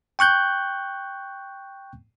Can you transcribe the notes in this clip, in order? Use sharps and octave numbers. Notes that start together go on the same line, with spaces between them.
G5 C#6 F#6 G6